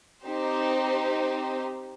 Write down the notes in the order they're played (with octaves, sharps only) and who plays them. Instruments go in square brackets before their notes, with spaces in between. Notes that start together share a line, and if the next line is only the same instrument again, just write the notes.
[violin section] C4 D#4 G4 C5